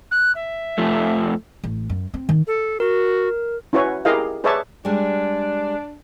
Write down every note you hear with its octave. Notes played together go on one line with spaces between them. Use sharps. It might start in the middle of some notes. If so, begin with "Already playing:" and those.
F#6
E5
F2 F3 A3
A1
F#2
C4
D#3
A4
F#4 A#4
C#4 E4 F#4 B4 C#5
E4 G4 G#4 A#4 D#5 F5
G#4 B4 C#5 D5 E5 A5
G3 G#3 D4